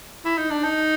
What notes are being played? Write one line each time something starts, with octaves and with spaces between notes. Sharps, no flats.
E4
D#4
D4
D#4